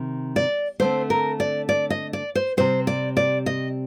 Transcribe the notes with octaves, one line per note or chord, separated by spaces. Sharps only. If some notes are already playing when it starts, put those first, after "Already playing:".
Already playing: C3 D#3
D5
D3 A3 C4 C5
A#4
D5
D5
D#5
D5
C5
C3 G3 C4 C5
D5
D5
D#5